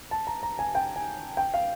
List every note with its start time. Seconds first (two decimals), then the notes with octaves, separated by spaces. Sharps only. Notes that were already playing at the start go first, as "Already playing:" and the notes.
0.11 A5
0.27 A#5
0.43 A#5
0.59 G#5
0.75 G5
0.96 G#5
1.37 G5
1.54 F5